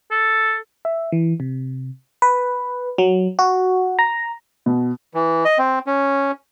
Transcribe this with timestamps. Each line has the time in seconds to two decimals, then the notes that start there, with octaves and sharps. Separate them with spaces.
0.11 A4
0.85 E5
1.12 E3
1.40 C3
2.22 B4
2.98 F#3
3.39 F#4
3.99 A#5
4.66 B2
5.14 E3
5.45 D#5
5.58 C4
5.87 C#4